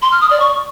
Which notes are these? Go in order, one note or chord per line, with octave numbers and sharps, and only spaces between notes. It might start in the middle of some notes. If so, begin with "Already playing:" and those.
C6
F6
D#6
D5
C#6